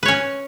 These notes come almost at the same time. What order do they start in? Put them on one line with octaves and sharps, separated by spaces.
B4 C#5 C#4